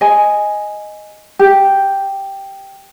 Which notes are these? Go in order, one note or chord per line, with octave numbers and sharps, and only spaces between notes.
D#5 G#5
G4